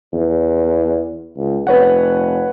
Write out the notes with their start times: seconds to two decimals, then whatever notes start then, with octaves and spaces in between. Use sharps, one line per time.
0.13 E2
1.36 C#2
1.67 F1 B4 C#5 F#5